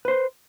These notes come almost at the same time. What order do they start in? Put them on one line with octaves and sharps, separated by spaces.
B4 C5 C6